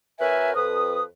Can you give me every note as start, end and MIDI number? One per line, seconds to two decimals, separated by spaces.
0.19 0.53 42
0.19 0.53 54
0.19 0.53 70
0.19 0.53 71
0.19 0.53 76
0.19 0.53 80
0.56 1.03 41
0.56 1.03 71
0.56 1.03 87